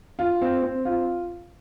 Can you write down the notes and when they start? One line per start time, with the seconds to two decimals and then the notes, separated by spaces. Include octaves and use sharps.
0.19 F4
0.42 C4
0.63 C4
0.85 F4